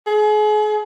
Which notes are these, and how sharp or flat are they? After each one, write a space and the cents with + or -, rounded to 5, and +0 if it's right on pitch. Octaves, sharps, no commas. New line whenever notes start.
G#4 +35